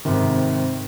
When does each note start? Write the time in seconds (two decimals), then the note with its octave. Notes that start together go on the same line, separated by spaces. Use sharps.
0.05 G#1 G#2 C3 D#3